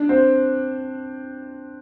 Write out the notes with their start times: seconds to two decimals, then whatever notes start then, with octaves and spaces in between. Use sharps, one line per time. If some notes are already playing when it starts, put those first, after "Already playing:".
Already playing: D4
0.09 C4